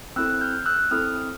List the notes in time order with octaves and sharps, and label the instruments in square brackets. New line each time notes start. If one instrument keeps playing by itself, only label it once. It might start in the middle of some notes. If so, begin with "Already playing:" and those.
[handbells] C4 E4 A4 E6 F#6
F6 G6
E6 F#6
C4 E4 A4 D#6 F6